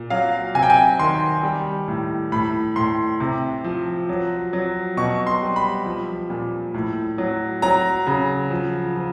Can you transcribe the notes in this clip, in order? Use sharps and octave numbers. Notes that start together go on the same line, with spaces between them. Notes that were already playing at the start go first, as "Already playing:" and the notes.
Already playing: A#2
F#3 F5
C3 G#5
G5
G#5
D#3 C6
G3
A2
A2 B5
A2 C6
C3
F3
F#3
F#3
B2 C#6
C6
G3
B5
F3
A#2
A2
F#3
F#3 A#5
C#3
F3
F3